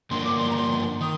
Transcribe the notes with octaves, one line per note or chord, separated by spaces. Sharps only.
G2 D3 F3 A#3 D4 C6
D6
C6
A#5
C6
D#3 D#6